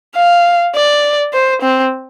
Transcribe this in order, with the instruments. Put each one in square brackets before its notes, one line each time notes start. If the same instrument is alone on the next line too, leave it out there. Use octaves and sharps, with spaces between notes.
[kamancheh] F5
D5
C5
C4